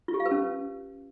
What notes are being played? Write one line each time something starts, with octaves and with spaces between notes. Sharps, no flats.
F4
G4
F5
B4
C#4